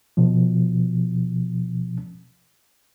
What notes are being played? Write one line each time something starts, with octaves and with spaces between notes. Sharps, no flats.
B2 F3